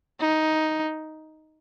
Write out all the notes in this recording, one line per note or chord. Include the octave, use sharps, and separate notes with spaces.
D#4